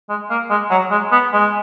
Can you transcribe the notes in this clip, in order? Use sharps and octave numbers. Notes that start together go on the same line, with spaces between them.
G#3
A#3
G#3
F#3
G#3
B3
G#3